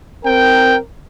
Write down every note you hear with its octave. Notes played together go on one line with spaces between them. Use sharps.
C4 A#4 G5